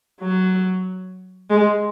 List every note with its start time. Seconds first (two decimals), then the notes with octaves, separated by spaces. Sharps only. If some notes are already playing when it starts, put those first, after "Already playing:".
0.21 F#3
1.50 G#3